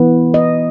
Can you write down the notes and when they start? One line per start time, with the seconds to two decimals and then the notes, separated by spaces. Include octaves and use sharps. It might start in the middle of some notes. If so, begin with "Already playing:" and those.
Already playing: E3 B3
0.34 D#5